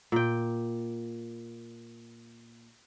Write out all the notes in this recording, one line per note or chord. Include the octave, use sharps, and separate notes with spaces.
A#2 G5